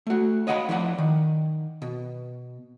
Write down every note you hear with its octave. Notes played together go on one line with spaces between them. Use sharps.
A3 F#4
C#5 D#5 F5 F#5 G#5 B5
F3 E4 D5 F#5
D#3
B2